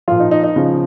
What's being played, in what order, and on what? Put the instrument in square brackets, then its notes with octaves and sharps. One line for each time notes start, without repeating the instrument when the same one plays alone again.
[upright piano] A#2 F3 F4
D#4
D#4
D#4
C#3 F3